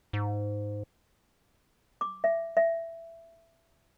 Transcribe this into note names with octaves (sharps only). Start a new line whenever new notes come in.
G#2
D6
E5
E5